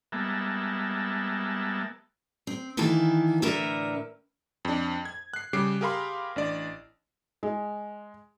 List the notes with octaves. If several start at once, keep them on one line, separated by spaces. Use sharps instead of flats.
G3 G#3 A#3 B3 E5 A5
C4
D#3 E3 A#3 E4 A4
A2 D3 A#4 B4 D5 E5
F2 D4
G#6
F#6 C7
C#3 G3 D6 C7 D7
G4 G#4 A#4 F5 B5 C6
A1 D4 D5
G#3